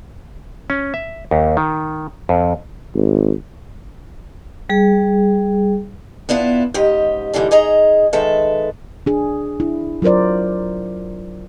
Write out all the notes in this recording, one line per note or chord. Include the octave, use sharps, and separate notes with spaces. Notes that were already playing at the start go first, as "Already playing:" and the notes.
C#4
E5
D#2
D#3
F2
G#1
G3 G#4
B3 D4 E4 F4
G#2 C#3 G4 D#5
G#2 D3 E3 G3 D4
D#4 G#4 D#5 A#5
D#3 G#3 A4 B4 E5
D4 G#4
D4 E4
F#3 F4 A#4 C5 D5